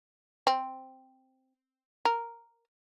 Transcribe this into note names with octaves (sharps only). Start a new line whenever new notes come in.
C4
A#4